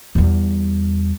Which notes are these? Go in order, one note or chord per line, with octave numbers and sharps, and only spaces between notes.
E2 G3